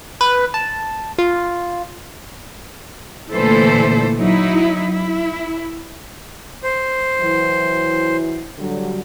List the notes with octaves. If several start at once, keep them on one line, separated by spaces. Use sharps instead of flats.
B4
A5
F4
A#2 D3 E3 A3 A4 C5
F#3 D#4 E4
E4
C5
E3 F#3 E4
D3 F#3 G3